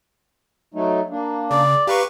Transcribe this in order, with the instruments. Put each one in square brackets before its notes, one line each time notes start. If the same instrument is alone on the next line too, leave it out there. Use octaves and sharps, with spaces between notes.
[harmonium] F#3 A3 D#4
A#3 D4
[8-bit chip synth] C#3 [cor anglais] D5
[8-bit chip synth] G4 B4 C#6 [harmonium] F5 A#5